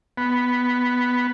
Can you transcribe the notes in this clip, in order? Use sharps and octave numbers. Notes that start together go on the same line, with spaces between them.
B3